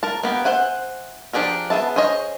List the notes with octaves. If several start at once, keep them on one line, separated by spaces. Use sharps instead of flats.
A#4 A5
A#3 B3 G4
C5 E5 F#5 G#5
F3 D4 G4 G#4 A#4
B3 G#4 E5 A5
G#4 C5 C#5 D#5